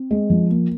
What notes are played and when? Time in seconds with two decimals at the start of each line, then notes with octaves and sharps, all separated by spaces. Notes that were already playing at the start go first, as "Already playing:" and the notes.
Already playing: C4
0.11 G#3
0.30 F3
0.50 A#3